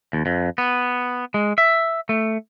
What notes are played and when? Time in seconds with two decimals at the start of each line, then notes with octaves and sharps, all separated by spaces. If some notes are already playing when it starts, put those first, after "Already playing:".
0.13 D#2
0.26 F2
0.58 B3
1.34 G#3
1.58 E5
2.09 A3